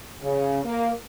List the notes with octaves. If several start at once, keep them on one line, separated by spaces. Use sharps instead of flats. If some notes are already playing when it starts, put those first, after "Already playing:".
C#3
A#3